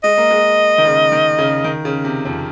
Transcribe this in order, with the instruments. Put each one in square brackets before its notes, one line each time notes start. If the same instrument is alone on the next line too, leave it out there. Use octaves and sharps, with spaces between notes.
[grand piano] G#3 [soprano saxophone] D#5
[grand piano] A#3
G#3
D#3
C#3
D#3
C#3
D#3
C#3
C3
F2